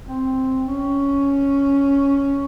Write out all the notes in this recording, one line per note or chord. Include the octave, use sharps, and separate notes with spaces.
C4
C#4